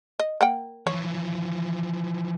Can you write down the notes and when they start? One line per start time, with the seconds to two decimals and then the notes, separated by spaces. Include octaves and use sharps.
0.19 D#5
0.41 A#3 F#5 G5
0.87 E3 F3 C#5